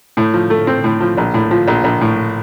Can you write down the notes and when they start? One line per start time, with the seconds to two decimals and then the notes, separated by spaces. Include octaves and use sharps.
0.17 A2
0.34 F3
0.50 A3
0.67 C4
0.84 A2
1.01 F3
1.17 A#1
1.34 A2
1.51 F3
1.68 A#1
1.84 A#1
2.01 A2